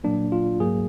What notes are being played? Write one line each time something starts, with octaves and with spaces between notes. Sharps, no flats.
A#2 F#3 A#3 D4
F4
G#2 F#3 A#3 G#4